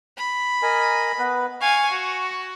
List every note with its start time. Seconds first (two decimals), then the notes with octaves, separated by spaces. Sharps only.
0.17 B5
0.62 A#4 D#5 G#5
1.19 B3 B4
1.61 F5 G#5 C#6
1.91 F#4